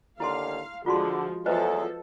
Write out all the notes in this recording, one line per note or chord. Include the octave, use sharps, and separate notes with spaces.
D#2 D3 E4 F5 A5 C6
D3 F3 G#3 F4 F#4 C6
E2 F3 F#3 G#4 A4 B4 C5 D#5